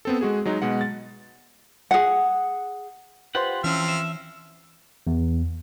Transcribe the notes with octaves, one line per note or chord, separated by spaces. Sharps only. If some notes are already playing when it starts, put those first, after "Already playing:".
B3 C4 A4
G#3 F#4 G#4
F#3 G#3 D#4
B2 G#3 F#5
A6
G#4 F#5
F4 G4 B4 C5 F#5 C6
E3 F3 C4 C#4 E5 F6
E5
E2